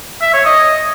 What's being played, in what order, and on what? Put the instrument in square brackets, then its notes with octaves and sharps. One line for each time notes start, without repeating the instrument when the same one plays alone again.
[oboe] E5
C#5
D#5